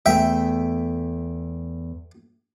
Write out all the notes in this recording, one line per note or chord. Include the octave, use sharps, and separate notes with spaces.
E2 A3 G#4 E5 G5